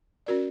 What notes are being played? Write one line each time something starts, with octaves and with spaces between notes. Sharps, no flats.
C#4 F#4 A#4 D5